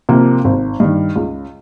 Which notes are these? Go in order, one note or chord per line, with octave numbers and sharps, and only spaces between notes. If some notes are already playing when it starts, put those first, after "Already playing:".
C3 F3 A#3
G#1
G2 D#3
C#2